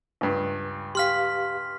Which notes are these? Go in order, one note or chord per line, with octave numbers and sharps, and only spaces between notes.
C#2 G2
G4 F5 C6 F6 B6